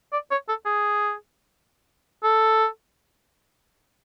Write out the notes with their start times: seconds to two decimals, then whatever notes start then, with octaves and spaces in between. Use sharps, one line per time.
0.13 D5
0.31 C#5
0.49 A4
0.66 G#4
2.24 A4